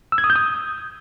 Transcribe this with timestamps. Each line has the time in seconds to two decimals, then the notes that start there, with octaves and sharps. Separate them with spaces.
0.12 E6
0.18 G#6
0.24 D#6
0.30 G6
0.35 D#6